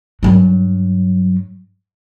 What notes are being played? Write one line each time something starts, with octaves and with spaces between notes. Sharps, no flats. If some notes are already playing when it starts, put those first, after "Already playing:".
G2 F#3